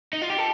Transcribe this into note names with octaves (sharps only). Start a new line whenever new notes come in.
D#4
F4
G4
A4